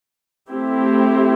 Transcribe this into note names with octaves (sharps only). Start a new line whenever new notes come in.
A3 C4 E4 G4